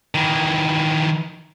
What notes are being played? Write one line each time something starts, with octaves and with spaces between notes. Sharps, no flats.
D#3 E3